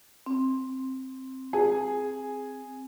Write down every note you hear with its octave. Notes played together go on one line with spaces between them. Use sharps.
C4
G#4